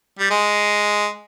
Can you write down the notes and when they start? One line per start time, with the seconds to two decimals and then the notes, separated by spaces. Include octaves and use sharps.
0.19 G3
0.30 G#3